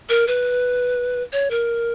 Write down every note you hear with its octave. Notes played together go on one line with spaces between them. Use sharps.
A#4
B4
C#5
A#4